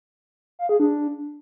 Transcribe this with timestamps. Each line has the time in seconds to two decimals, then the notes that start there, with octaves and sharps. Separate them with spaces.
0.59 F5
0.69 G#4
0.80 D4